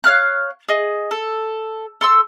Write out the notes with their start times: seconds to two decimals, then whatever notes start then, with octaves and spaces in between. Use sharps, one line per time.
0.04 C#5 F5 F6 F#6
0.69 G#4 D#5
1.11 A4
2.01 A4 C6 E6